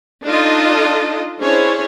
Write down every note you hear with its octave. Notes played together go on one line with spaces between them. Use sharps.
D4 D#4 F4 A4 D#5
C#4 D4 E4 G#4 C5 C#5